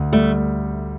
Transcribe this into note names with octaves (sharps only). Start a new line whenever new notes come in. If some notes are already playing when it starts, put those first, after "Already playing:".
Already playing: D2
G3 A3